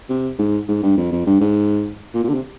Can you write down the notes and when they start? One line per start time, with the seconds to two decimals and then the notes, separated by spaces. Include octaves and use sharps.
0.10 C3
0.39 G#2
0.68 G#2
0.83 G2
0.97 F2
1.12 F2
1.27 G2
1.41 G#2
2.14 A#2
2.24 A#2
2.29 D3
2.34 C3